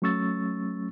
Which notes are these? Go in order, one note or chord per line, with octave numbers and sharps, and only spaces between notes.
F#3 A3 C#4 C#6 E6 A6